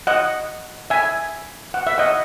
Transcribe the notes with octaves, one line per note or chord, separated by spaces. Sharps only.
D#5 F#5
E5 G#5
F#5
E5
D#5 F#5